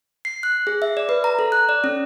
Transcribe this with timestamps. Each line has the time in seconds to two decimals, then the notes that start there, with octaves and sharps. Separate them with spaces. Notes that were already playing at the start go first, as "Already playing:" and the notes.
0.25 C7
0.43 F#6
0.67 G#4
0.82 E5
0.97 D5
1.09 B4
1.24 A#5
1.39 A4
1.52 F#6
1.69 D5
1.84 C#4